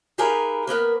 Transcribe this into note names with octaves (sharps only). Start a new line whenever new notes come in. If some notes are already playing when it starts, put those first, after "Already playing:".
D#4 G4 G#4 A#4 B4 F5
A#3 B3 A#4 B4